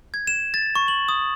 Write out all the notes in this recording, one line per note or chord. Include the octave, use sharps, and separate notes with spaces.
G#6
E7
A6
C#6
F#7
D#6